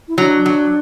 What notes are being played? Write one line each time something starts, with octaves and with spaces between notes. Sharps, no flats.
E4
F#3 D4
F#3